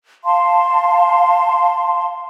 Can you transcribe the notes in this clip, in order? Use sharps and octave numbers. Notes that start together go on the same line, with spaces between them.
F5 A5 C6